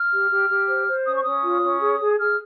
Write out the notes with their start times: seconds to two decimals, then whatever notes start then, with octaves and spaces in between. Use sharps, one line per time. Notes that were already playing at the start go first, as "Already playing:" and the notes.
Already playing: F6
0.12 G4
0.31 G4
0.49 G4
0.68 C5
0.87 C5
1.06 C#4 D#6
1.15 C#6
1.24 C#4 D#6
1.43 F4
1.63 C#4
1.81 G#4
2.00 G#4
2.18 G#4 F6